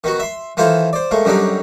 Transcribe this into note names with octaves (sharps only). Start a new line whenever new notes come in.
D#3 B3 F#4
E5 C6
D#3 E3 E4 F4 A4 C5
C5 D5
A#2 G#3 A3
F#2 D3 F#3 G3 D4 D#4